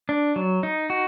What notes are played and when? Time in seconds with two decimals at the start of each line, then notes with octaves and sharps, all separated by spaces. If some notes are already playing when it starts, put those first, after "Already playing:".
0.09 D4
0.36 F#3
0.63 D#4
0.90 F#4